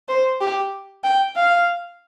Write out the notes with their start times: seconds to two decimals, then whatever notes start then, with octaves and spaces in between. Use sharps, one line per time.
0.09 C5
0.41 G4
1.04 G5
1.36 F5